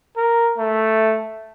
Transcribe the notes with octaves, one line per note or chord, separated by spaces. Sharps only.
A#4
A3